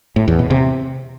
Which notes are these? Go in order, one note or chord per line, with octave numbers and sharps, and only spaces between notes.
A2
E2
B2
C3